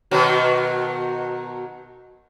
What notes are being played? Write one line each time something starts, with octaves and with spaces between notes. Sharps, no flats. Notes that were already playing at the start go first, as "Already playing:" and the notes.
B2 D#3 F#3